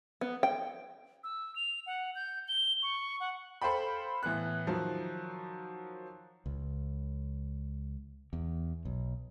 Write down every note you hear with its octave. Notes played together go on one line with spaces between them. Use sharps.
B3
G5
E6
F7
F#5
G6
G7
C#6
F#5
A4 C5 F5 G5 B5
A2 E3 B3 F#6
D#3 F3 F#3
C#2
E2
B1